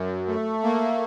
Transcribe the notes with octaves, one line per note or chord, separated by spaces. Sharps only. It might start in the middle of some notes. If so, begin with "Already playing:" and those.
Already playing: F#2
A3
A#3